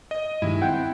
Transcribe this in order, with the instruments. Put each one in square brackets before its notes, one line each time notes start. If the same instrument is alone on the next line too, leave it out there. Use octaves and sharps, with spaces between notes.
[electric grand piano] D#5
[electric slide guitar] G2 D#3 G#3 [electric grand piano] E4
[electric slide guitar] C4 [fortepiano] F#5 G5